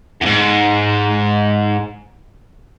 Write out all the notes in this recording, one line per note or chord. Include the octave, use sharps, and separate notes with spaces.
E2 G#2